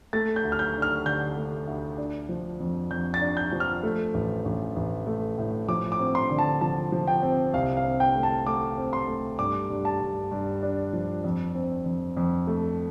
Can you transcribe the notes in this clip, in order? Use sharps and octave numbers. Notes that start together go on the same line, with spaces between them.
A3 A6
G6
D2
F6
G6
D3
F6
D3 G6
A3
D2
D4
F3
F2
F2 G6
A6
D4
G6
F3
F6
A3
A1
A1
A1
A3
A2
F3 D6
D6
C4
C6
D3
A5
F3 A5
F3
G5
C4
C2 F5
F5
C4
G5
A3
A5
A3 D6
C4
C6
A3
G2 D6
G2
A5
G2
G2
D4
F3
F2
C4
F2
F2
A3